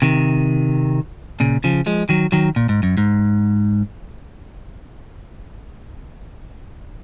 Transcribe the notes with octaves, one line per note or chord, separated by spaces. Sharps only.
C3 D#3
A#2 C#3
C#3 F3
F3 G#3
D#3 F#3
D#3 F#3
A#2
G#2
F#2
G#2